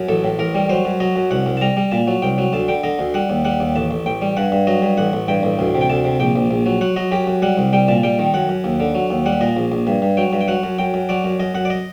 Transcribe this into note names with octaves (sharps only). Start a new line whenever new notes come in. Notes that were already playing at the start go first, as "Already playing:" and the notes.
Already playing: F#2
A1 A4
A2
A1 A#4
G3
F#3 C5
F#2
F#3 D#5
F#2
C2 F#5
C2
A5
G3 A#5
G3
A#2 A5
F#3
C2 G5
F#3
D2 A5
D3 G5
D3 D#5
D2
G3 F#5
D#2
G3 F#5
D#2
A1 A5
A1
A1 G5
G3
G2 F#5
G2
F#3 D#5
G2
A1 F#5
A1
G2 G5
A1
D2
C3
G5
D2 A5
C3
A#1 G5
A#1
A#1
F#3
F#3 F#5
F#3 D#5
F#2 G4
F#2
G3 F#5
C2
G3 G5
A#2 A5
G3 G5
D#3
F#2 F#5
F#2
D#2
D3
F#3
D#2
G3 F#5
A#2 D#5
A#1
A#1
G2
G2
F#3 G5
G2
G5
F#3 F#5
F#2
F#2 G5
F#2
F#3 D5
F#2
F#2 D#5
F#2 F#5
D5
D#5